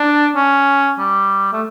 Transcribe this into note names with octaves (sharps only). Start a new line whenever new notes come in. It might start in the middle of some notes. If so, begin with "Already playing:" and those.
Already playing: D4
C#4
G3
A3